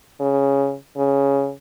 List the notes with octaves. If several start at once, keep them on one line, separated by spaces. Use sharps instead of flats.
C#3
C#3